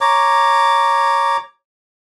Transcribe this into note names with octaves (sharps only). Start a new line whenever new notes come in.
C#5 A#5 D6